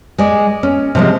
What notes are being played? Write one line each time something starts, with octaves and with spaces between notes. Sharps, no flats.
G#3 D5
C#4
C3 F3 G#3